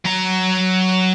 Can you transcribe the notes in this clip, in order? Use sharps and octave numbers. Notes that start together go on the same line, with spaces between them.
F#3 A#5